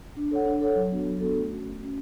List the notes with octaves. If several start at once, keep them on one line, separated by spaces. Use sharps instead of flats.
D4
A4 C#5 F#5
D4
A4 C#5 F#5
F#3
B3 D4 F#4 A4
F#3
B3 D4 F#4 A4
A3
C#4 F#4
A3
C#4 F#4